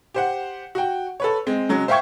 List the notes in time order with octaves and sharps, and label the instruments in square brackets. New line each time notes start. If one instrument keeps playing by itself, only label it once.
[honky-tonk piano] G4 C5 F#5
F#4 G5
A4 B4 C#5
G#3 C4
C#3 F#3 G#3
C5 E5 F5 G5 C#6 G#6